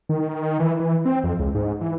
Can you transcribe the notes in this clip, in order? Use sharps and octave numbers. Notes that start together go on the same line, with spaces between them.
D#3
E3
E3
C4
F2
C#2
G#2
E3